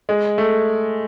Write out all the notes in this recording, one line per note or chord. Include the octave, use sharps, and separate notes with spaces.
G#3
A3